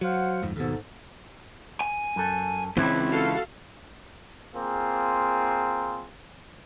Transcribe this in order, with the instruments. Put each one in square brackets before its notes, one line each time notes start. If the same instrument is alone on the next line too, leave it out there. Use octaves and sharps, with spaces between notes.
[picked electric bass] F#3 [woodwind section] C5 F5 F#5
[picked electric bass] D1 F2 G#2
[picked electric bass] D#2 B2 [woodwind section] G#2 A4
[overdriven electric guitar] G#5
[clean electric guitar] F#2 A4
[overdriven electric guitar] C#2 [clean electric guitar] E3 E4 [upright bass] C4
[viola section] F#4 A4 F5
[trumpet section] A#3 C4 F4 G#4